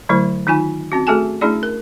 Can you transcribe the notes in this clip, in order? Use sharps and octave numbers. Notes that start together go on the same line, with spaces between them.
D3 F#3 A3 E4 C5
D#3 D#4 F4 G#5
C4 C#4 F#4
A3 F#4 G#4 A4 G#5 A5
A3 C#4 D4 E4 G#4 D5
A#4